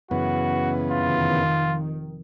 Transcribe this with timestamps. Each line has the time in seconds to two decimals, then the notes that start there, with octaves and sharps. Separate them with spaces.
0.11 F#2 C#3 E3 B3 F#4
0.91 F1 D#3 F4